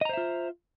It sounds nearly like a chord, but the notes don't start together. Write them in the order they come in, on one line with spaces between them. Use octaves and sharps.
D#5 A#5 C5 E5 F4